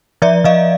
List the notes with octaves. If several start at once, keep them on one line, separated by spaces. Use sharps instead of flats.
F3 D5 E5
F3 D#5 F5